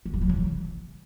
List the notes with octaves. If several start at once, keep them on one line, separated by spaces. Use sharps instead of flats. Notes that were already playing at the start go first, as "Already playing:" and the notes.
D3
G3
F#3
C#3
E3